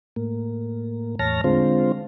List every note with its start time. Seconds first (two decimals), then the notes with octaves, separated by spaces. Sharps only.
0.16 A2 A#3
1.19 E2 A2 C#5 A5 F6 A#6
1.44 D3 G#3 C4 F4 C5